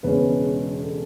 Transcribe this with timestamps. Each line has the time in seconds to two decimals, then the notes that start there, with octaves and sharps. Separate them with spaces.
0.03 E1 E2 C#3 G#3 C#4 B4
0.83 A4